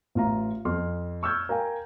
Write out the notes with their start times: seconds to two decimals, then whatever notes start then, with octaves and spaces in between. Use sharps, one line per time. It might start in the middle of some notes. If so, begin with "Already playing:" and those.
0.15 A1 F4 A#5
0.65 F2 C6 F6
1.23 C#6 E6 F6 G6 G#6
1.49 A#4 F5 G5 G#5